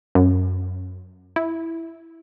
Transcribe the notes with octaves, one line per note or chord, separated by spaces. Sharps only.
F#2
E4